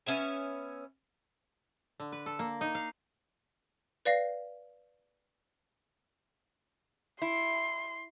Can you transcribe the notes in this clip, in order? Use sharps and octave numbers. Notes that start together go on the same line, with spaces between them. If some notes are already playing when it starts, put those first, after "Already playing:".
B3 C#4 E5 G#5
D3
B4
A4
A#3
D#4
F5
B4 D5 F5 A#6 C7
E4 C6